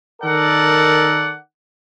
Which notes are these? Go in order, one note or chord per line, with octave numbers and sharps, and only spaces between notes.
D#3 A4 A#4 D5 F#5